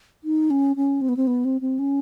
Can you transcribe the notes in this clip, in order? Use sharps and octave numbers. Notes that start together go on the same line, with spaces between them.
D#4
C#4
C#4
C4
B3
C4
B3
C4
C4
C#4